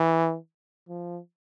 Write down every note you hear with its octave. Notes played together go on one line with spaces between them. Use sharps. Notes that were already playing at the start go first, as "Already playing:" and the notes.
Already playing: E3
F3